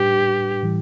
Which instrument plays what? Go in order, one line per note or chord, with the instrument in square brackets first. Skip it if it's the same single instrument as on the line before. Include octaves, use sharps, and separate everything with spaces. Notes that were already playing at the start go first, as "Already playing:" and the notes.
Already playing: [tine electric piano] A2 G3 D4 B4 [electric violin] G4
[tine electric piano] A2 E3 G3 E4